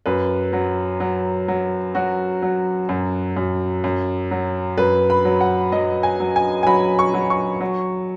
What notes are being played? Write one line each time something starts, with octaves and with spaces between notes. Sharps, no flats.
F#2 B4
F#3
F#3
F#3
F#3 F#4
F#3
F#2
F#2
F#2
F#3
F#2 B4
B5
F#3
F#5
F#3 D#5
G#5
F#3
G#5
G#5
F#3 B5
C#6
F#3
C#6
F#3